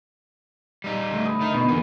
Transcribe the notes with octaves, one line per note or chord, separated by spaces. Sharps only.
G3 D#4
D3 A3
B5 D#6
D#3 D#4
B2 B3 D#4 B5
E2 D3 A#3 B3